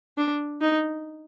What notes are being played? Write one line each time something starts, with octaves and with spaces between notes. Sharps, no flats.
D4
D#4